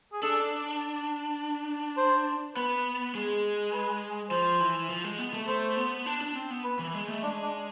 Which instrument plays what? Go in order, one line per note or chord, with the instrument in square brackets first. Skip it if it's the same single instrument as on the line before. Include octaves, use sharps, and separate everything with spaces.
[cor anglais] G#4
[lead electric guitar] D4 [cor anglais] A4
[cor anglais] C5
[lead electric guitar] B3 [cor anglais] B4
[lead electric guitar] G#3
[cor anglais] B4
[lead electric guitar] F3 [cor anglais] C5
[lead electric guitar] E3
F3
G#3
B3
A3
[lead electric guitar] A3 [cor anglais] C5
[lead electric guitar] B3
D4
D4
C4
B3
[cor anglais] B4
[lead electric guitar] E3
G#3
A3
[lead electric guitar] G#3 [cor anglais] D4
[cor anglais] D4